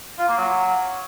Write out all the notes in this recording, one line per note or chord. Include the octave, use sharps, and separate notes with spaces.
F4
A#3
F#3